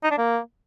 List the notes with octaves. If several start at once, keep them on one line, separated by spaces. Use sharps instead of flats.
D#4
D4
A#3